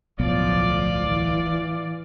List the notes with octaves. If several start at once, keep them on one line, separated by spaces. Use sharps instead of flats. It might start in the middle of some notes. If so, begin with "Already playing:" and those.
D1 B1 A2 F3 B3 F4 D5
E3